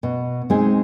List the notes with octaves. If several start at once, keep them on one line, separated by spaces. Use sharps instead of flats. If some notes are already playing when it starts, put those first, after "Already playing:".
B2
G#3 C4 D#4 G#4